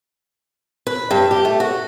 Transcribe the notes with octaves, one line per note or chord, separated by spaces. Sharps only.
B4
G2
G4
A3
F#4